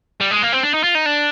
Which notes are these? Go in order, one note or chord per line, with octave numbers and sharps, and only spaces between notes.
G3
G#3
A#3
C4
D4
D#4
F4
D#4
D4